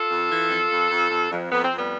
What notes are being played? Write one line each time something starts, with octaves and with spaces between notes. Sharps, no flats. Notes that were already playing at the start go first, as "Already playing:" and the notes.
Already playing: F4 A4
F2
E3
F2
F2
F2
F2
F2
F2 B3
C4
F2
G3 B3